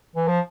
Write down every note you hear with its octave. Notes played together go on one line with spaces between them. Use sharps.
E3
F3